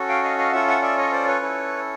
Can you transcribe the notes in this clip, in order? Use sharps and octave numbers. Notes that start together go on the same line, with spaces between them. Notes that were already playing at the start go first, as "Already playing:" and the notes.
Already playing: C#4 F#4 A4
F5 G5
D#5 F5
D#5 F5
C#4 F4 A4 E5 F#5
E5 F#5
D5 E5
C#5 D#5
C5 D5
B4 C#5
C#4 E4 A4